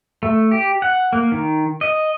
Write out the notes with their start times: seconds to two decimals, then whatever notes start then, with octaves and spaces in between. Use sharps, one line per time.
0.23 A3
0.51 G4
0.82 F#5
1.13 A#3
1.32 D#3
1.81 D#5